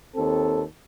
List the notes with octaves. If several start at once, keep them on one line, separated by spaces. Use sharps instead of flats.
D#2 C4 A4